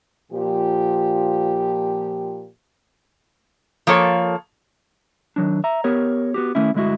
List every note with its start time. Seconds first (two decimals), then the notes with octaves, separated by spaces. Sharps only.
0.32 A#2 F3 G4
3.87 F3 A#3 A4 C#5
5.36 D#3 F#3 D4
5.64 E5 A#5
5.84 B3 G4 A#4 C#5
6.34 B3 F#4 G4
6.55 D#3 A3 C#4 E4
6.74 D2 G2 G#3 E4 F#4